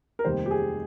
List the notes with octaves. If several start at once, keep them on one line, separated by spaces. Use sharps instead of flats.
A#4
F1 D#2 D#3 G3 C5
G4
G#4